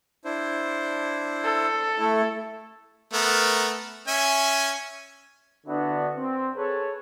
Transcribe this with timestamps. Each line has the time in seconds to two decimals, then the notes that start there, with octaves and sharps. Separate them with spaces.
0.25 D4 E4 C5
1.44 A4
1.98 A3 E4
3.13 A3 B3 A#4
4.08 C#4 E5 G#5
5.66 D3 B3 D4 E4 F#4
6.17 C4
6.57 G#4 A4 B4 C#5